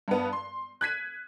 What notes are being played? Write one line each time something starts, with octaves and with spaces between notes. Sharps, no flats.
G2 B3
C6
F#6 G#6 B6 D#7